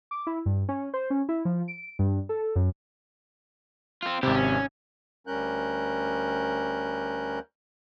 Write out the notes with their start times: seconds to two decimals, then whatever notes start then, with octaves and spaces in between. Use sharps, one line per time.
0.11 D6
0.27 E4
0.46 G2
0.69 C#4
0.94 C5
1.10 C#4
1.29 E4
1.45 F3
1.68 D7
1.99 G2
2.29 A4
2.56 F#2
4.03 C4 F4
4.23 G#1 C3 E4 G4
4.34 C#4
5.27 D2 G3 C#4 A#4 F#6 G6